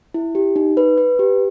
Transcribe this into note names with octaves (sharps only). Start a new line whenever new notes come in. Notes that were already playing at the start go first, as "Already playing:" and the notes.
E4
G4
D#4
B4
B4
G4